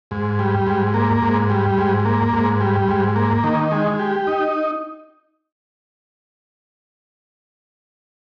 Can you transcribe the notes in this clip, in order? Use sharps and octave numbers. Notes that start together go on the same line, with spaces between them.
G#2
G3
G#2
A#3
G#2
G3
G#2
A#3
G#2
G3
G#2
A#3
D#3
G#3
G4
D#4